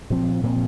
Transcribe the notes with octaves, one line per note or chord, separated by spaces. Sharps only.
A#2 F3 C4
A#2 F3 C4